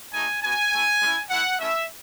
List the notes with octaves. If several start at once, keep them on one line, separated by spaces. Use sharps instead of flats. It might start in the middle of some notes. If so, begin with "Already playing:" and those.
A3 D#4 F#4 G#5
B3 F#4 G#5
A3 E4
G#3 C#4 E4
A3 E4 F#5
A3 C#4 E4 E5